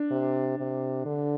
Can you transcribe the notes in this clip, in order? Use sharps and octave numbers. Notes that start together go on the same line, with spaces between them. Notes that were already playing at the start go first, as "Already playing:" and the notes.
Already playing: D4
C3
C3
D3